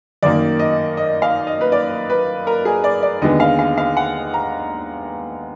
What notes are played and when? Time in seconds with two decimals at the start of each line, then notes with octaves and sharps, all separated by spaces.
0.23 F#2 D#3 A#3 D5
0.59 D#5
0.97 D#5
1.22 F5
1.47 D#5
1.61 B4
1.72 D5
2.10 B4
2.47 A#4
2.65 G#4
2.84 D5
3.03 D5
3.22 D#2 D3 G#3 B3 D#5
3.40 F5
3.59 F5
3.78 F5
3.97 F#5
4.34 A#5